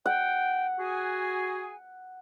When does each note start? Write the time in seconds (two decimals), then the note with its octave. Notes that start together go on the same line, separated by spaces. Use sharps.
0.06 F#5 G5
0.79 F#4 G#4 G#5